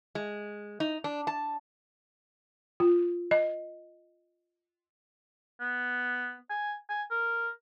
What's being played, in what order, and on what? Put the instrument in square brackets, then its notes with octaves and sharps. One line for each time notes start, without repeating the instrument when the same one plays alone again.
[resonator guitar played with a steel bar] G#3
D#4
D4
A5
[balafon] F4
D#5
[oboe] B3
G#5
G#5
A#4